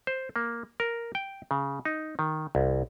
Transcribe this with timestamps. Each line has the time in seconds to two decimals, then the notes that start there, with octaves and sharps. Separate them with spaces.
0.07 C5
0.36 A#3
0.80 A#4
1.15 G5
1.51 C#3
1.85 D#4
2.19 D#3
2.55 C2